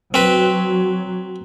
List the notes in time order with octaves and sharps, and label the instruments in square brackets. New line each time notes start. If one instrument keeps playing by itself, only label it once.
[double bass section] F#3 [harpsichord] C4 B4